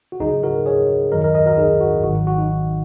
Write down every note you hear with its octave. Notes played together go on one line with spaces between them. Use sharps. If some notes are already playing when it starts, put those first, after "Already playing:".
F#4
C#2 C#3 F#3 D#4 G#4
F#4 A#4
G#4 C#5
F#2 D#3 F#3 A#4 D#5
A#4 D#5
A#4 D#5
F#4 A#4
D#4 G#4
F#4
G#1 G#2 D#3 F#3 F#4
F#4
D#4